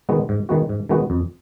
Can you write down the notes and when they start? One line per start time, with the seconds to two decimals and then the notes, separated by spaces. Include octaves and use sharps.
0.09 D#3 G#3 B3 F#4
0.29 G#2
0.49 D#3 G#3 B3 F#4
0.69 G#2
0.89 D#3 G#3 B3 F#4
1.10 F2